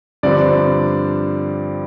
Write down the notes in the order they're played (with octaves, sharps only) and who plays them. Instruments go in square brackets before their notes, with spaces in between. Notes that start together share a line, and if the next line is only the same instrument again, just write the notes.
[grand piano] G2 D3 F3 C4 D5